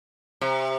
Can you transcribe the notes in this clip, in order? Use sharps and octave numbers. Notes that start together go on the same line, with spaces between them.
C3